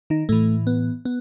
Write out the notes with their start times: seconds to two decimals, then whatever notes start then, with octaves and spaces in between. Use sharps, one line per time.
0.10 D#3 D#4
0.29 A2 E3 A3
0.67 B3
1.05 B3